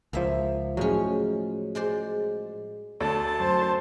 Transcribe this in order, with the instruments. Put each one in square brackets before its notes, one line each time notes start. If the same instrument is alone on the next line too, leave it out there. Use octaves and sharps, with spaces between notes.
[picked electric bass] C#2 F3 [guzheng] A#3 E5
[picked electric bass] A2 F3 F#3 [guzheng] G#3 C#4
[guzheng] G#3 C5 D5
[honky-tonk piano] D2 [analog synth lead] A4 [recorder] A5
[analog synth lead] F#2 [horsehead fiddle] C5